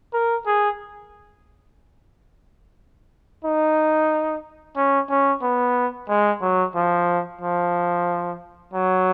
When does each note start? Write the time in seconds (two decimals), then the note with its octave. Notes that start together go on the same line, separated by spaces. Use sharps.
0.13 A#4
0.46 G#4
3.44 D#4
4.77 C#4
5.09 C#4
5.42 B3
6.08 G#3
6.41 F#3
6.75 F3
7.41 F3
8.73 F#3